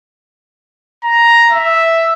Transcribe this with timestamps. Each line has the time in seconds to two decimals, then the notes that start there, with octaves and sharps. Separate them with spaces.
1.04 A#5
1.51 E5